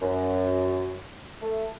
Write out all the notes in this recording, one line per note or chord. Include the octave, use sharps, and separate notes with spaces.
F#2
A3